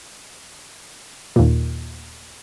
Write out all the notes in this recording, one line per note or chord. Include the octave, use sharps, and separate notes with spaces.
D#2 A#2